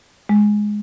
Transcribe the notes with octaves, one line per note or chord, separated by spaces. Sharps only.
G#3